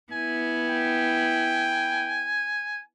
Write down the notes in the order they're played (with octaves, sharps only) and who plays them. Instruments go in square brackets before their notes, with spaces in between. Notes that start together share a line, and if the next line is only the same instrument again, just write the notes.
[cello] B3 E4 [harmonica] G#5
[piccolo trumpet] G5